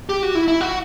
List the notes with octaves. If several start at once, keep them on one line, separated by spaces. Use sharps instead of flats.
G4
F#4
E4
E4
F#4